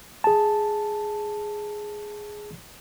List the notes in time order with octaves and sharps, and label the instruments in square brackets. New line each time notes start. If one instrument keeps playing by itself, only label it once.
[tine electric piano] G#4 A5